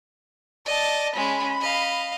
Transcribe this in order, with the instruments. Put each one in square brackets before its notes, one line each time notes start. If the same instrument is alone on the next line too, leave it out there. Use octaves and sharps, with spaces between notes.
[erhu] D5 [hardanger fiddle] D#5 A5
[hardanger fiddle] G#3 C#4 [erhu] B5
[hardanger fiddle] D#5 F5